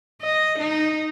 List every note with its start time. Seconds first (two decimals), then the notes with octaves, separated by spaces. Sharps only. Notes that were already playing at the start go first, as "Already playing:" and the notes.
0.22 D#5
0.59 D#4